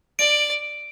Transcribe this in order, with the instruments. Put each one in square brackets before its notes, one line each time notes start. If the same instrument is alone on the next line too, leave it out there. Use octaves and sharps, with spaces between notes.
[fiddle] D5 [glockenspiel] D7